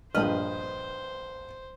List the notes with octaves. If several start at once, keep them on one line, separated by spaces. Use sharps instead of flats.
A#1 G2 B4 C5 D#5 F6